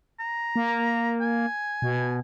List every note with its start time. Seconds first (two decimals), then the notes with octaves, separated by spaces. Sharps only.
0.20 A#5
0.56 A#3
1.21 G#5
1.82 B2